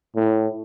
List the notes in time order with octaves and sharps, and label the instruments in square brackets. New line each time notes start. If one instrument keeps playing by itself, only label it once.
[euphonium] A2